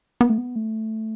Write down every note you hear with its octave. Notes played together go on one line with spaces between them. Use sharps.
B3
A3
B3
A3